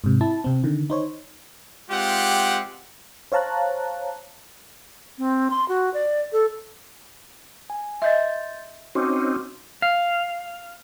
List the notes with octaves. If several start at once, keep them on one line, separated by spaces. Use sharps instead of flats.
G#2 C3
E4 A5
C3 C4
D3 D#3
D#4 C5 C#5
G#3 C4 F4 G4 F#5
C5 C#5 F5 A5 A#5 F#6
C4
C6
F#4
D5
A4
G#5
D#5 E5 C6 G6 A6
C4 C#4 D#4 F#4 C6 D6
F5